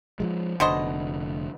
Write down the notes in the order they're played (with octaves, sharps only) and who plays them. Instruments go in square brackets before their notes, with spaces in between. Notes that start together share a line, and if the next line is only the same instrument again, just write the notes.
[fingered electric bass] F3 F#3 G#3
[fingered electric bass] F1 A#1 D3 [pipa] B2 C5 D#5